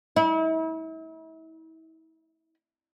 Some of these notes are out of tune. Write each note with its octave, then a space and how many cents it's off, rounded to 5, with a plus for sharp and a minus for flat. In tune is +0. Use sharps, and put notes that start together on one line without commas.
E4 -40